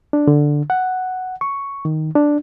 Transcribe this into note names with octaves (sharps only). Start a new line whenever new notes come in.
D4
D3
F#5
C#6
D#3
D4